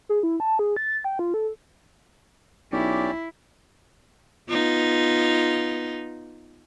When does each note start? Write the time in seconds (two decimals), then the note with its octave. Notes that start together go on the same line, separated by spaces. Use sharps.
0.09 G#4
0.23 E4
0.40 A5
0.59 G#4
0.76 A6
1.04 G5
1.19 F4
1.34 A4
2.72 B1 C#4 E4 G4 D5
4.49 B3 D#4 F4